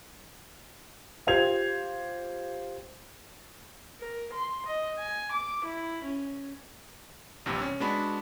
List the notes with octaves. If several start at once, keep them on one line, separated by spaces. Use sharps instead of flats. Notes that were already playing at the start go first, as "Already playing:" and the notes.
F4 G4 C5 G#6 F7
A#4
C6
D#5
G#5
D6
E4
C#4
A#1 E2 G2 C3
C#4
G#3 B3 D4 F#4 B5